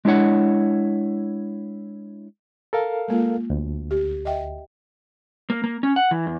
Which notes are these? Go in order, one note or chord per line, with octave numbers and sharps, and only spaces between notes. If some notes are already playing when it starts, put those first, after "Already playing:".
G#3 D4 E4 C#5 F#5
A4 A#4 F5
G#3 A#3 F4
D2
G4
D#5 E5 G5
A#3
A#3
C#4
F#5
E3
E2